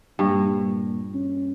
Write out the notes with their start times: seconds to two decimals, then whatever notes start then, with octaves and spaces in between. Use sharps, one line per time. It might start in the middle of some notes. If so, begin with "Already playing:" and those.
0.19 G2 A#2
1.14 C#4